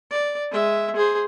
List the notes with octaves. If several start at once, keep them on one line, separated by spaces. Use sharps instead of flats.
D5
G#3 E5
G#4 C5